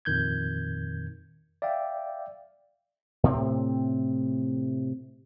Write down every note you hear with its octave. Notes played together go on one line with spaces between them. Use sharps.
F2 A#2 D#3 G6 G#6
D5 E5 F5 G5
A2 C3 C4